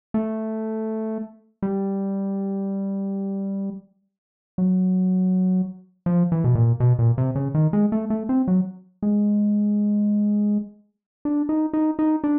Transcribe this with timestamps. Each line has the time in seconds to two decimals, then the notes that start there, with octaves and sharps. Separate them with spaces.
0.14 A3
1.63 G3
4.58 F#3
6.06 F3
6.32 E3
6.44 B2
6.55 A#2
6.80 B2
6.99 A#2
7.18 C3
7.35 C#3
7.55 D#3
7.73 G#3
7.92 A3
8.10 A3
8.29 C4
8.48 F#3
9.03 G#3
11.25 D4
11.49 D#4
11.73 D#4
11.99 D#4
12.24 D4